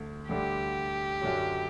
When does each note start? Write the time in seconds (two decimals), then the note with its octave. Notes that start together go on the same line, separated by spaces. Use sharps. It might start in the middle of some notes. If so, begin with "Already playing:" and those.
Already playing: D2 D3
0.29 D2 D3 G3 D4 G4
1.21 F#2 D3 F#3